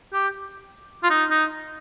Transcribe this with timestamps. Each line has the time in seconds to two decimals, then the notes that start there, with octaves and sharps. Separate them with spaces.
0.13 G4
1.03 F4
1.10 D#4
1.30 D#4